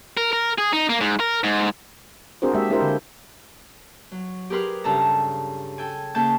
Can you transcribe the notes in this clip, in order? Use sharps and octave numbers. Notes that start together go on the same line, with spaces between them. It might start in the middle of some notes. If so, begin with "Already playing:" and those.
A#4
A#4
G#4
D#4
A#3
G#2
A#4
G#2
C4 D4 F#4 G#4 A#4 C5
G#3 A#3 G4 E5
A#3 D4 E4 G4 A#4 C5
D3
F#3
G4 G#4 A#4 B4 C6 F6
G2 C#3 A4 A5 A#5
A4 G5 G#5
C#3 A#3 C#4 A5 G6